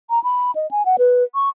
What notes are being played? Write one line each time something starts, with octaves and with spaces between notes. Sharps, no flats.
A#5
B5
D#5
G#5
F#5
B4
C#6